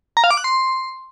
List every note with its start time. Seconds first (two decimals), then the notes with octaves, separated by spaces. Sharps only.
0.17 A#5
0.24 F5
0.31 D6
0.37 F#6
0.44 C6